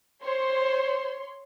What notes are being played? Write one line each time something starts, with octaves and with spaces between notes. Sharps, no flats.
C5 C#5 C6